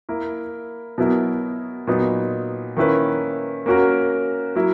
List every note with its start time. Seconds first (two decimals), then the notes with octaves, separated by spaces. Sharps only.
0.09 A#3 E4 A#4
0.98 B2 F#3 B3 E4 A#4
1.87 A#2 F#3 B3 D#4
2.77 D#3 A#3 C#4 E4 B4
3.66 A#3 C#4 F#4 A#4
4.55 F#3 A#3 E4 A#4